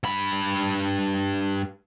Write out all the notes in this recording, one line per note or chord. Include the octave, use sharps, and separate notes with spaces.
G2 B5